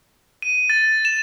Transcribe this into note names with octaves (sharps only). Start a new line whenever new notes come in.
D#7
A6
E7